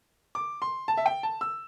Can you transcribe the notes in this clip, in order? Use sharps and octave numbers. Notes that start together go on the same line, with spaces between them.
D6
C6
A5
E5
G5
A5
E6